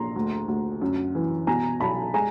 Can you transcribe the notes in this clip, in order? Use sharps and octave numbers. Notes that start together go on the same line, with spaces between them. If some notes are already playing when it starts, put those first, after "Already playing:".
Already playing: A#1 A#5 C6
D2
D2
F#2
E3
B2 G#5 A#5
B1 A5 B5
G#3 G#5 A#5